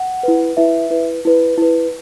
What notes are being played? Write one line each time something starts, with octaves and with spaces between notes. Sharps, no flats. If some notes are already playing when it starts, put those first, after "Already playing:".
Already playing: F#5
E4 B4
E4 B4 E5
E4 B4
E4 B4
E4 B4